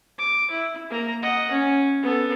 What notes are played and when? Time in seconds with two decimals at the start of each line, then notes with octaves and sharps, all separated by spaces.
0.19 D6
0.51 E4
0.90 A#3 A#5
1.22 D#5 F#5
1.51 C#4
2.03 B3 A4